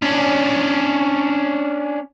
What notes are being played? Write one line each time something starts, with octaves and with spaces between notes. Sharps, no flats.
C#4 D4